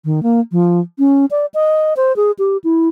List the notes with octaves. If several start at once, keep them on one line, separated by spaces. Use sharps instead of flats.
D#3
A#3
F3
C#4
D5
D#5
C5
G#4
G4
E4